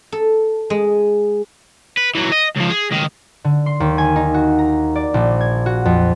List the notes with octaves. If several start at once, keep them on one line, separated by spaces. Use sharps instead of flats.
A4
G#3
B4
E3 F#3
D#5
C#2 F3
G#4
C#2 D#3
D3
C6
D#2
G#5
D#4
F#4
A#5
D5
A#1
G#6
F#4
F2